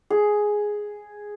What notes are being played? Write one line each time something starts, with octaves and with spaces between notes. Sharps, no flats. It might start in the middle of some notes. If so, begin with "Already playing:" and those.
G#4